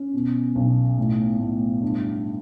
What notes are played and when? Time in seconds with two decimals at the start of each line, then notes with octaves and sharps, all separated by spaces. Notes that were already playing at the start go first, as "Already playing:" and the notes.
Already playing: C#4
0.13 B2
0.55 B1
0.98 A2
1.39 A2
1.82 G2